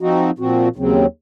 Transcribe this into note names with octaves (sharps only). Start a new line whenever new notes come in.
F3 C4 D#4 F#4
A#2 F3 C4 F#4
D#2 C#3 F#3 C4